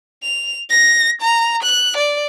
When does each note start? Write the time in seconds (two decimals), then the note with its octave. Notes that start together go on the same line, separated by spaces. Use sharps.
0.23 F7
0.70 A#6
1.21 A#5
1.63 F#6
1.97 D5